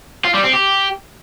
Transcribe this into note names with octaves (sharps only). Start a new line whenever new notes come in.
F4
G3
C4
G4